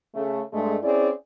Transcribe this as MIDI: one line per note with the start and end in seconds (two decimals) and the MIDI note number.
0.15 0.40 49
0.15 0.40 57
0.53 0.76 43
0.53 0.76 56
0.53 0.76 57
0.83 1.10 60
0.83 1.10 61
0.83 1.10 64
0.83 1.10 68
0.83 1.10 74